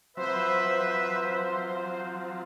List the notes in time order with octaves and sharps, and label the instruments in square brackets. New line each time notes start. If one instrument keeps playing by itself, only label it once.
[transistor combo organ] F3 F#3 C4 [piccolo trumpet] B4 [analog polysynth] C5 [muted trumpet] E5